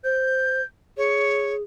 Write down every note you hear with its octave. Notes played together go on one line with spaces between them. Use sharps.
C5 G6
G#4 C#5